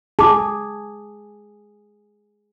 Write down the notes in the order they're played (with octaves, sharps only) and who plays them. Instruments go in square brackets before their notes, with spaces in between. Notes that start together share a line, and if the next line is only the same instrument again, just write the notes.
[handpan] G#4 [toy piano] A5 D6